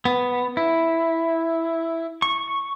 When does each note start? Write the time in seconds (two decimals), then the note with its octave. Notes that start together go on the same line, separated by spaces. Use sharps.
0.05 B3
0.57 E4
2.22 C#6